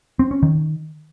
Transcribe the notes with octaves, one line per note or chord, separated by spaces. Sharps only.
C4
C#4
D#3